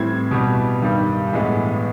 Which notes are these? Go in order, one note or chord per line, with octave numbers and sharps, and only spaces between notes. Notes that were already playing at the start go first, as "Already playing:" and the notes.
Already playing: A2 E3 G3 C4 G#6
B2 G3 B3
G2 D#3 G3
A2 E3 G#3 B3